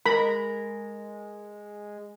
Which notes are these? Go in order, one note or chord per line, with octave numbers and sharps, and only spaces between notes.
G#3 A#4 B5